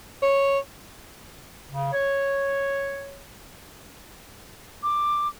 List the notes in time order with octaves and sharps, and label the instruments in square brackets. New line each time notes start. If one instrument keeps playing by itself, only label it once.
[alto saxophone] C#5
[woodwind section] C#3
C#5
[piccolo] D6